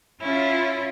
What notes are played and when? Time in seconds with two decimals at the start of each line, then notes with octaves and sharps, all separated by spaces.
0.21 C#4 E4 F4